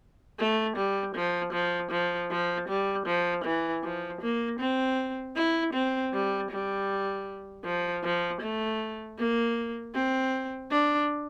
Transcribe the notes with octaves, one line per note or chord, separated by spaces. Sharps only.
A3
G3
F3
F3
F3
F3
G3
F3
E3
F3
A#3
C4
E4
C4
G3
G3
F3
F3
A3
A#3
C4
D4